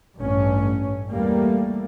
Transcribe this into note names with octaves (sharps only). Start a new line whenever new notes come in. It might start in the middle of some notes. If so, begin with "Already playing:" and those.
A1 G2 A3 C#4
E2 G3 A3 A#3